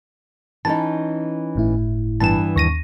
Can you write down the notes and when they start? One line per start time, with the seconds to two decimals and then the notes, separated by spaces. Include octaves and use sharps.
0.65 E3 C#4 D#4 A5
1.55 G1 A2 E4
2.20 G2 E3 B3 A5 E7
2.56 D#2 C#6 A#6 D#7